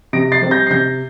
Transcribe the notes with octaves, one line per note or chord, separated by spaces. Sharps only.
C3 A#6 D7
A6 C7
G3 C4
G6 A#6
C7
C3 G6 A#6